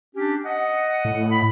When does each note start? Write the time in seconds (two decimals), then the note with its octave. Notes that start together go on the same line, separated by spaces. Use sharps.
0.15 C#4 D4 G4
0.45 D#5 F#5
1.05 A2
1.31 B5